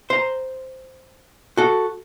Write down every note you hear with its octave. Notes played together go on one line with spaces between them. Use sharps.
C5 A#5
F#4 A4